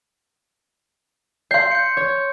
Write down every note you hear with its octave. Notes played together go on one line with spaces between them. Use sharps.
D5 F5 C6 G6 C7
G6 C#7
C#5